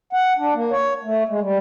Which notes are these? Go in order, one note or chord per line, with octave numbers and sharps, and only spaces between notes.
F#5
D4
A#3
C#5
A3
G#3
G3